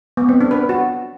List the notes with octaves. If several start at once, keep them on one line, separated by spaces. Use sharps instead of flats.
B3
C4
D4
B4
F#4